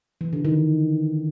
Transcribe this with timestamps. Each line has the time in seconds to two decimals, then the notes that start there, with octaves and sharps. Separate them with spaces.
0.21 E3
0.33 D3
0.45 D#3